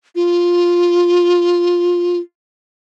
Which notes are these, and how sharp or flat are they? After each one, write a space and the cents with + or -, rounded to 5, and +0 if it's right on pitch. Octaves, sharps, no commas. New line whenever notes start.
F4 +5